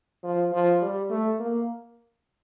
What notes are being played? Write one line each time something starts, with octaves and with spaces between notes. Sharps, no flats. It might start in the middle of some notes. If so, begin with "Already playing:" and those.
F3
F3
G3
A3
A#3